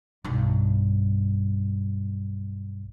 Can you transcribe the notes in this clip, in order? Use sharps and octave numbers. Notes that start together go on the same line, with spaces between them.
B1 G2